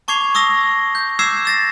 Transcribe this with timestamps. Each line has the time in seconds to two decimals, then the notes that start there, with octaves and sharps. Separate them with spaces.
0.08 A5 C#6 D6 G#6 C7 F7
0.35 C#6 D#6 E6 A#6 G7
0.95 G6
1.19 D6 E6 F#6 G#6 C7 E7
1.45 E6 A6 A#6